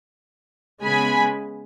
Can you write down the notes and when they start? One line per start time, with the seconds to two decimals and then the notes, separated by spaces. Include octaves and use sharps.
0.84 C#3 G#3 B3 G#5 B5